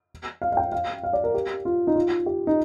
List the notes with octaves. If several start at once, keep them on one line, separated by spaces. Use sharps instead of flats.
F5
F5
G5
F5
F5
D5
A#4
G4
F4
D#4
F4
G4
D#4